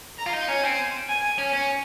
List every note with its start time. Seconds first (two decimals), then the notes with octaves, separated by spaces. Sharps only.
0.18 A#5
0.26 F4
0.33 D#4
0.48 C#4 G#5
0.63 C4
1.08 G#5
1.38 C#4
1.53 C#4